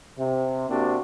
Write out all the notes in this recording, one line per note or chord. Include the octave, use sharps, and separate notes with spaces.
C3
C3 A#3 D4 F#4